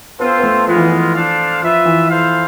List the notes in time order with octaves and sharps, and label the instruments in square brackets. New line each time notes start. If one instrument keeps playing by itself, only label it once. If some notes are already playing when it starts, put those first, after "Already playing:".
[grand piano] B3 [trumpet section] C4 F4 A4 C5
[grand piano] B3
A3
[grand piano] F3 [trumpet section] G#3 B3 F4
[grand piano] E3
F3
[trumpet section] D4 A4 C5 F5
[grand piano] F3 [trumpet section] F4 B4 E5
[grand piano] E3
[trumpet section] E4 A4 C5 F5